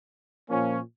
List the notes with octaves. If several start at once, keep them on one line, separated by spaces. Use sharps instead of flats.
A#2 F3 A#3 C#4